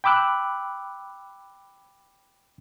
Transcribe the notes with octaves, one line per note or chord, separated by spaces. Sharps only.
G5 B5 D6 E6 F#6